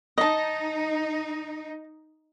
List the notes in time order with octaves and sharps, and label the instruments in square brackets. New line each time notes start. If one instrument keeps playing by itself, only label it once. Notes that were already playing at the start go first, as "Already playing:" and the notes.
[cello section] D#4 [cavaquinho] D#5 A5